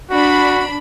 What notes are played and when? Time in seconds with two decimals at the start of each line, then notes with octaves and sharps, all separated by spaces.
0.11 D4 F#4 B5